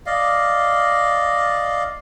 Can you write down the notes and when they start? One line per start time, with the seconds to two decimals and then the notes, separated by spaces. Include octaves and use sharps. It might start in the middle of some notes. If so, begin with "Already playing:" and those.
0.06 D5 D#5 F5